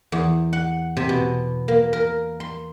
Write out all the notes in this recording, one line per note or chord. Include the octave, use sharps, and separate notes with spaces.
E2
F#5
C3
B2
A#3
A#4
C6